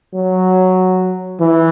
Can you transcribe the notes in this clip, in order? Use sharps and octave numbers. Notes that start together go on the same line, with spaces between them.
F#3
E3